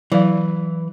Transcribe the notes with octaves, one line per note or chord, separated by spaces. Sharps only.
E3 F#3 D5 F5